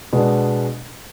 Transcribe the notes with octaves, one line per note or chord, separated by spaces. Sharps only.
B2 G#3 B3 D4